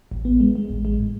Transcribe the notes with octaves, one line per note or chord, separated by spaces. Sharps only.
A1
B3
G#3
G#3
A1
G#3
A2